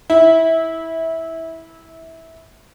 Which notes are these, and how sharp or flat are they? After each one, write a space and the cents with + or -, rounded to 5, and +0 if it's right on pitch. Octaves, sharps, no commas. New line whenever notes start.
E4 -15